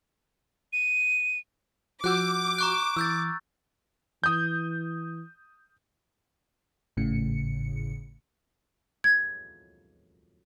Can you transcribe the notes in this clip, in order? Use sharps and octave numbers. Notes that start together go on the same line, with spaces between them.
D#7
F3 F#4 D6 E6 F#6 G6
A#5 C#6 F#6
E3 E6 G6 A6
E3 D#6 G6
G#1 A2 C#3 C#7
G#6